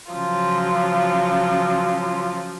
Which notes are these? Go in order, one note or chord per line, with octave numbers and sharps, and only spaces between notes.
C#3 F3 F#3 F4